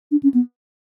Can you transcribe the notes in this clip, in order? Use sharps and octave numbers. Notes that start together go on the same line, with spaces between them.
D4
C#4
B3